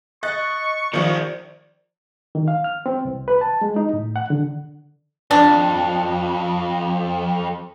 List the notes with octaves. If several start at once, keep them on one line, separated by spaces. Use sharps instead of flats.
D#5 C#6 F#6 A6
D#3 F3 A#4 C5 D5
D#3
F5
F6
C4
C2
B4
A5
G#3
D#4
A2
F#5
D3
F2 D4